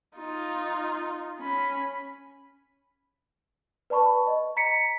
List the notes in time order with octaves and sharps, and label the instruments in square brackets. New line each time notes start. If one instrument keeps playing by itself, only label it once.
[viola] D#4 F4
C#4 B5
[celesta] B4 D5 A5 B5 C#6
D#5
A#5 B6 C#7